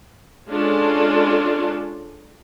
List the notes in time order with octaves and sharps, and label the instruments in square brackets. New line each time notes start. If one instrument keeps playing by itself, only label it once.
[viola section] G#3 C#4 D4 F4 A4